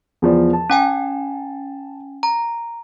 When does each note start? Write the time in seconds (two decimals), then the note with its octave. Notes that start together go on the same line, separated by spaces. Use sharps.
0.22 E2 F3 D5
0.53 A5
0.70 C#4 G5 G#5
2.23 A#5